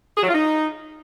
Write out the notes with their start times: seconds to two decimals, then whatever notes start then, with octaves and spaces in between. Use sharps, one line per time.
0.17 G#4
0.23 F#3
0.29 F4
0.34 D#4